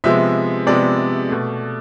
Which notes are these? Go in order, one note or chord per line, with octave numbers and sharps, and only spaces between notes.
C3 F3 G#3 B3 E5
C3 F3 G#3 B3 D5
B2 A3